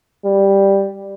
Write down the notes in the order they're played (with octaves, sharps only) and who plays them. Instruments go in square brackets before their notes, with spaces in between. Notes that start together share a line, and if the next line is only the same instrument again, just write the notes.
[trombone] G3